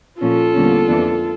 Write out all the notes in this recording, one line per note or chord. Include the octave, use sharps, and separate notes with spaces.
A#2 F3 C#4 F4 A4
E2 D3 G3 A#3 C#4
F2 E3 A#3 D4